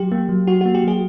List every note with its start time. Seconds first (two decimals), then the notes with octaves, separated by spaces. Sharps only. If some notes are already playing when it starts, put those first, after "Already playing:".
Already playing: F#3 G4
0.12 A#3
0.29 F#3
0.47 F#3 F#4
0.61 A#3 F#4
0.75 G4
0.84 F#3 G#4